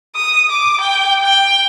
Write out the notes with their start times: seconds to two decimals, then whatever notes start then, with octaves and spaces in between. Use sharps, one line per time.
0.16 D#6
0.50 D6
0.81 G5
1.22 G5